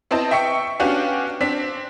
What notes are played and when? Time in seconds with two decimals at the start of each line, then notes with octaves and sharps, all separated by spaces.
0.11 B3 C4 E4 C5 D#5 A5
0.31 E5 G5 C#6 C#7
0.80 B3 C#4 D4 F#4 G4 F5
1.41 C4 D4 B6